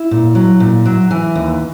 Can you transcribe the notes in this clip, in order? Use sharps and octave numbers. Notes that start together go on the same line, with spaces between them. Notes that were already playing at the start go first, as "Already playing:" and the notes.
Already playing: E4
A#2
F#3
A#2
F#3
E3
D#2